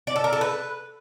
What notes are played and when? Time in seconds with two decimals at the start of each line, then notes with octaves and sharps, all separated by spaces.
0.07 D5
0.16 A4
0.24 A#4
0.33 A4
0.41 B4